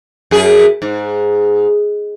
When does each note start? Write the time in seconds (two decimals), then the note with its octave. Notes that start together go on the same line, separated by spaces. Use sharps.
0.31 F#2 G#4
0.82 G#2